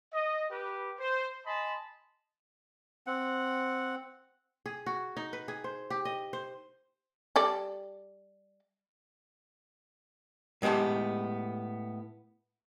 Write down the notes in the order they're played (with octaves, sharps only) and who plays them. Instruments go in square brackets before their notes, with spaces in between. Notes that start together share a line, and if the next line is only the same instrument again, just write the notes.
[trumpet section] D#5
G4 B4
C5
D#5 G#5 A5 B5 C6
[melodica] C4 F#5
[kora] G#4
F#4
D#4
B4
G#4
C5
G4
D#5
C5
[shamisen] G3 A4 D5
[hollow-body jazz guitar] A2 G#3 B3 G4 A5